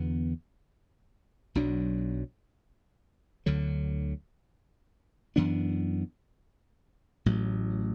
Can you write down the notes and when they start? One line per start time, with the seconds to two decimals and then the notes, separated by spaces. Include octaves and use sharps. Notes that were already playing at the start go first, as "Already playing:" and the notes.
Already playing: E2 D3 B3
1.55 B1 B2 F#3 D4
3.46 D2 D3 F#3
5.36 F#2 E3 B3 D4
7.26 A1 A2 F#3